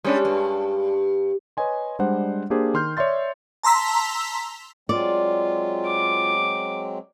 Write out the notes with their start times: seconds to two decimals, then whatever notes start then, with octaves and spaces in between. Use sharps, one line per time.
0.04 G3 G#3 C#4 D4
0.25 G2
1.57 B4 C#5 D#5 G#5 C6
1.99 G3 G#3 D4 C5 F#5
2.50 A#3 D4 G4 G#4 C5
2.74 D#3 C6 F6 G6
2.97 C#5 D5 E5 C6 A6
3.63 A5 A#5 C6 E6 B6
4.89 F#3 G#3 C4 F4 D5
5.87 D6